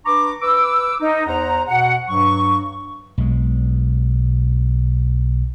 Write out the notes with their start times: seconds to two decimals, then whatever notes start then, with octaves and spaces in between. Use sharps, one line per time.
0.06 D4 B4 A#5 C#6 D6
0.42 B4 D6 E6
1.01 D#4
1.27 E2 C5 F#5 A#5
1.68 B2 F#5
2.09 G2 F#3 C#6
3.18 B1 G#3